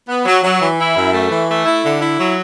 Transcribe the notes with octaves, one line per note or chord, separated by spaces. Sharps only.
B3
F#3
F#3
E3
E4
F#2
A3
E3
A3
E4
D3
E4
F#3